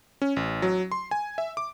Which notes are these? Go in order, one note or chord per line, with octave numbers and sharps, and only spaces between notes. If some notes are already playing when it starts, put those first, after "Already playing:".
C#4
A1
F#3
C6
G#5
E5
D6